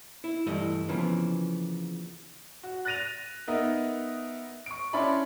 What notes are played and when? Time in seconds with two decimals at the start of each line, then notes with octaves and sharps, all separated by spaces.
0.24 E4
0.46 G2 E3 A3 E4 D#5
0.89 C#3 E3 F3 A#3 B3 D4
2.63 F#4
2.85 F#6 A6 A#6 D#7 F7
3.48 B3 D#4 A#4 D#5 E5
4.66 C#6 D7
4.93 C#4 D4 E4 D5 B5 C6